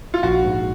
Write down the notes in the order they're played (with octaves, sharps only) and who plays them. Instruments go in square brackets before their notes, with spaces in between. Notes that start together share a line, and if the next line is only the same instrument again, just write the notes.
[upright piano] F4
[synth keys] A#1 [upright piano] F#4
[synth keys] G#2